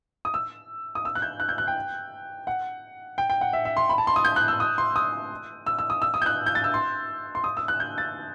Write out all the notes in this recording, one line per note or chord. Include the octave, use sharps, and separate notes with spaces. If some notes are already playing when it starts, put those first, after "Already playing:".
D#6
E6
D#6
E6
F#6
G6
F#6
G6
F#6
G5
F#5
G5
G5
F#5
E5
E5
C6
B5
A5
C6
D#6
G6
F#6
E6
D#6
C6
D#6
E6
E6
D#6
E6
D#6
G6
F#6
G6
A6
E6
C6
C6
D#6
E6
F#6
G6
A6